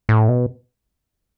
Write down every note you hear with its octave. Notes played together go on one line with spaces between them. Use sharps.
A2
B2